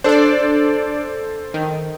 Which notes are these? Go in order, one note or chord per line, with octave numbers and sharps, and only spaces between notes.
D4 A4 C5 D5
D#3